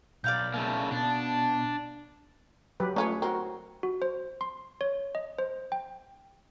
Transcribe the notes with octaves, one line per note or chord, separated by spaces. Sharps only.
B1 D5 F5 G6
C#3 A3 A#3 A5
B2 D4
F#3 G4 B4
A3 C#4 F4 G#4 B4 C#5
C4 F#4 A#4
F#4
C5
C6
C#5
D#5
C5
G5